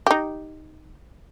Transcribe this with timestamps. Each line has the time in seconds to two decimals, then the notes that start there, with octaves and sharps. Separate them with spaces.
0.07 D#4 G4